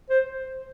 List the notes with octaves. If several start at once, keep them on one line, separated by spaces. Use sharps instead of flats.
C5